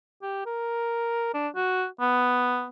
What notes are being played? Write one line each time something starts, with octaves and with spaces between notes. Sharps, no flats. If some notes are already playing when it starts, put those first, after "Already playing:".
G4
A#4
D4
F#4
B3